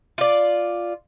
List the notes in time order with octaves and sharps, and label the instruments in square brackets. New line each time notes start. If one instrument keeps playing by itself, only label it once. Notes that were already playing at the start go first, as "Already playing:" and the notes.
[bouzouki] F4 D5